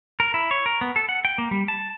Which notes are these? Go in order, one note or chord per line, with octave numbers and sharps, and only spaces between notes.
A#4
E4
C#5
A#4
B3
A4
F#5
G5
A#3
G3
A5